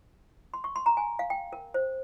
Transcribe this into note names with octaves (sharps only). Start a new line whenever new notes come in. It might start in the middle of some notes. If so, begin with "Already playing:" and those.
C6
C#6
C6
A#5
G#5
F5
G5
A#4
C5